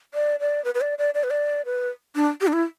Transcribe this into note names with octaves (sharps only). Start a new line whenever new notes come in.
D5
D5
B4
B4
D5
D5
D5
B4
D5
B4
D4
G4
D4
E4